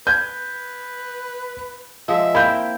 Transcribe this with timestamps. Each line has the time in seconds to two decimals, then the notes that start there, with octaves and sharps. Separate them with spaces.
0.07 B4 G6 G#6
2.08 F3 G#3 E5
2.35 A#3 C4 E4 B5 G6